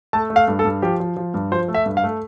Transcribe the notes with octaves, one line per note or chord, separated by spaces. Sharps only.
A3 A5
A3
F5
G2
A4
G2
F3 G4
F3
F3
G2
F3 C5
A3
E5
G2
F5
A3